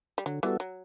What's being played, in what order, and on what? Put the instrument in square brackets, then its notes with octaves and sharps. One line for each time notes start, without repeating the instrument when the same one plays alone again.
[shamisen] G3
[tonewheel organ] D3 [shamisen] F#3
[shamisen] E3 [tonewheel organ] G3 B3 F#4 A4
[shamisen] F#3